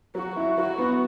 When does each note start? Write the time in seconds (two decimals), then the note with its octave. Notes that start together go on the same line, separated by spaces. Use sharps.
0.15 F#3 F#4
0.36 E4
0.58 F#3 F#4
0.78 B3